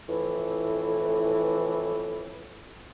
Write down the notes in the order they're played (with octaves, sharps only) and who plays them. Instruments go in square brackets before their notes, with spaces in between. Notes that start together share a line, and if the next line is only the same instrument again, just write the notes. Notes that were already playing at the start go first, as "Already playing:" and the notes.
[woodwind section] F2 A2 E3